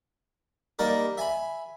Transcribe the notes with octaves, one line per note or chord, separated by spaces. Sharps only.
G3 A#3 D#4 A#4 D5
E5 G#5 B5